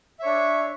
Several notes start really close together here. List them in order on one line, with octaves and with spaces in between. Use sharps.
E5 C#5 D4